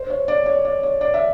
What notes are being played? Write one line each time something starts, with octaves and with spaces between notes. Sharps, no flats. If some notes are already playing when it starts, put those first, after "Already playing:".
Already playing: C5
C#5
D5
C#5
D5
C#5
D5
E5